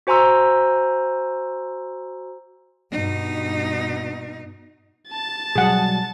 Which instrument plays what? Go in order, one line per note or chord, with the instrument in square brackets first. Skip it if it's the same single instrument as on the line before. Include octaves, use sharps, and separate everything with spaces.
[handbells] F#4 C5 G#5 A#5 C6 E6
[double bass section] G2 [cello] B2 D#4
[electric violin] A5 A6
[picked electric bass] B2 F#3 G3 [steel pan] G#4 F#5